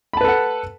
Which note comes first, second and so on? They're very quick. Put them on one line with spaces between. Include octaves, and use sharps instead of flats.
B5 A5 B4 A4 F#5